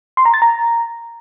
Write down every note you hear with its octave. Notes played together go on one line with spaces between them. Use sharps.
C6
A#5
A6
A#5